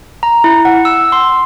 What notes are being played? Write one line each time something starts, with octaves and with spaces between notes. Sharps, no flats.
A#5
E4
F#5
E6
C6